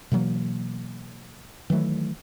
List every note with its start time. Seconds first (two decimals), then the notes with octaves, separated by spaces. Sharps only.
0.12 B2 E3 F#3 A#3
1.70 D#3 E3 F#3 A3